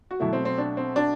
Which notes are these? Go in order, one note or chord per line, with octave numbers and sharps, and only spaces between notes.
F#4
B2 E3 F#3 A3 E4
C4
C4
D4
C4
D4